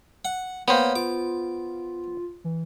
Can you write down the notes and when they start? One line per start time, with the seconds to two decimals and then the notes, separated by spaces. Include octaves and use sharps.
0.25 F#5
0.68 A#3 B3 G4 C5 C#5
0.96 F4 D6
2.44 E3